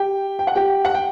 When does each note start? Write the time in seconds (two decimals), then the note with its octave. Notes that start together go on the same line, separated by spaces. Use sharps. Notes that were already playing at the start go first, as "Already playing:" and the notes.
Already playing: G4 G5
0.39 G5
0.47 F#5
0.55 G4 G5
0.85 F#5
0.94 G5